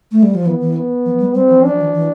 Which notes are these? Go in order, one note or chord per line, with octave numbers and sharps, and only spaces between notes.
A3
G3
F3
E3 B3
E3
B3
F3
G3
G3 C4
F3
F3 D4
E3
E3